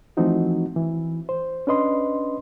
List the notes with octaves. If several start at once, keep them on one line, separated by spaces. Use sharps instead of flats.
E3 F3 A3 C4 D#4 F#4
E3
C5
C#4 D4 B4 D#5 C6